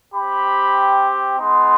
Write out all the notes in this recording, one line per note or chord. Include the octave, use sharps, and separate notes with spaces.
C4 G4 B5
G#3 B3 D#4 C6